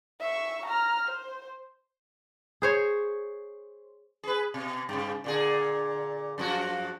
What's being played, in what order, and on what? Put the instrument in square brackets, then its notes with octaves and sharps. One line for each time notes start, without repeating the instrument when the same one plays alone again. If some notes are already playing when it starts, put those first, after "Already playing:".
[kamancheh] E5 C#6
A#5 F6
C5
[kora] G#4 C5 C#5
[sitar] G#4 B4
B2
G2 C#3
A#2 D3 G#4
F#2 F3 F#4